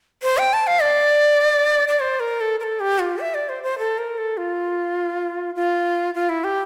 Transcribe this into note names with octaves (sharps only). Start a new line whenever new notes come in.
C5
G5
A5
F5
D5
D5
C5
A#4
A4
A#4
A4
G4
F4
E5
D5
C5
C5
A4
A#4
A4
F4
F4
F4
E4
G4